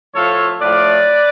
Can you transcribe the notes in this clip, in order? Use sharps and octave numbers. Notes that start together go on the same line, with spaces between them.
A2 F3 A3 F4 A4 C#5
A2 F3 A3 B4 D5